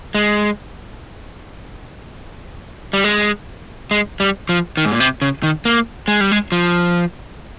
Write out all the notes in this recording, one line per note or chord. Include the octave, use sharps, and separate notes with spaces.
G#3
G3
G#3
G#3
G3
F3
D#3
G#2
A#2
C3
C#3
D#3
A#3
G#3
G3
G#3
F3